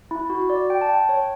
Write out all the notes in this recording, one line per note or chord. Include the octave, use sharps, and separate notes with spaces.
E4
F#4
D5
G5
A5
G5
C#5